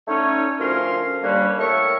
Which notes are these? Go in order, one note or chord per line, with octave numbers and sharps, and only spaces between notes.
D3 A3 C#4 D#4 C#5
D2 F3 C#4 A#4 F5 C6
D#2 D3 G3 A#3 C#4 B4
A2 A3 A#4 C#5 E5 C#6